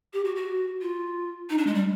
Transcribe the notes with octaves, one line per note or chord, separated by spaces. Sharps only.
G4
F#4
F#4
F4
D#4
D4
G#3
G3